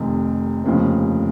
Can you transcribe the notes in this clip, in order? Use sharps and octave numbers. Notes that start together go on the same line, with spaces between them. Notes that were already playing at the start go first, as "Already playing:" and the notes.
Already playing: F1 F2 C3 D#3
F1 D#2 C#3 F3